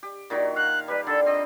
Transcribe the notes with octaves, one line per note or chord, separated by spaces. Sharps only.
G4
A#2 D#3 F#3
F5 F#6
G3 A#4 B4
D3 A4
C4 D#5